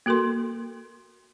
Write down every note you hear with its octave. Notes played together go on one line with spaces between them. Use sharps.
A#3 F#4 A4 A#4 C6